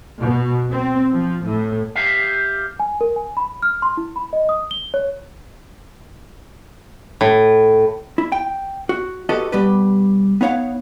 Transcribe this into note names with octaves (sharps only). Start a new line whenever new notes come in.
B2
C4
F3
A2
G4 E5 F5
G#5
A#4
G#5
B5
F6
C6
E4
B5
D#5
D#6
G7
C#5
A2
E4
G5
F#4
F#4 G4 A4 B4 D#5
B2 G3 G4 B4
B3 D#4 C#5 F5 F#5